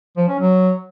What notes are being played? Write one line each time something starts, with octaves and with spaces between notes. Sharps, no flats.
F3
C#4
F#3